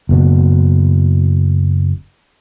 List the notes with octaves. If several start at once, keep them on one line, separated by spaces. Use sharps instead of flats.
F#1 B2